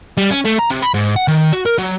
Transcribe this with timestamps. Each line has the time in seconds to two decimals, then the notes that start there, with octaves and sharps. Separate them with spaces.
0.17 G3
0.31 C#4
0.45 A3
0.59 A#5
0.70 C3
0.82 B5
0.94 G#2
1.16 F#5
1.28 D#3
1.53 F#4
1.66 A#4
1.78 F#3